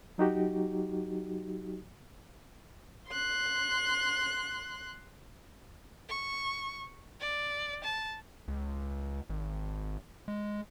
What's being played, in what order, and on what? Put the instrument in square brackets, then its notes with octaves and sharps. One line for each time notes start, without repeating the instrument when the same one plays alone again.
[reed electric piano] F#3 D#4 F#4 G4
[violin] C6 F#6
C#6
D5
A5
[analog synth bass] C#2
G#1
G#3